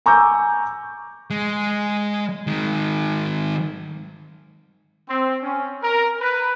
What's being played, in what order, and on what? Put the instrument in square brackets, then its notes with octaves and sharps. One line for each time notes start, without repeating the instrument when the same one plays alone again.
[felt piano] G#5 A#5 C#6 D6 E6 G6
[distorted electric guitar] G#3
D#3 G#3
[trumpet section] C4
C#4
A#4
B4